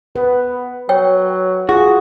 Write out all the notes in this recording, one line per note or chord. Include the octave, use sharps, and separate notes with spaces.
B3 B4
F#3 C#5 G5
F4 F#4 G#4